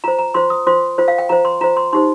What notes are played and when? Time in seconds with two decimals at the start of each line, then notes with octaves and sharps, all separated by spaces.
0.04 F4 C5 A#5
0.19 A#5
0.34 F4 C5 C6
0.50 D#6
0.67 F4 C5 C6
0.98 F4 C5
1.08 F5
1.18 G5
1.29 F4 C5 A#5
1.45 C6
1.61 F4 C5 A#5
1.77 C6
1.93 D#4 G4 C5 C6